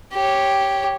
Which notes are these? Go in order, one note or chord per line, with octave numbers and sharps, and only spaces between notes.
G4 C#5